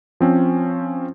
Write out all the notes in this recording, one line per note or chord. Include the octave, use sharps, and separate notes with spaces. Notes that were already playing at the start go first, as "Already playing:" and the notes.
F3 C4 C#4